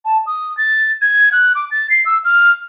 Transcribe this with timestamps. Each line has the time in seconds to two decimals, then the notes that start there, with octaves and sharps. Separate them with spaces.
0.05 A5
0.26 D#6
0.57 A6
1.02 G#6
1.32 F#6
1.55 D6
1.71 A6
1.90 C7
2.06 E6
2.25 F6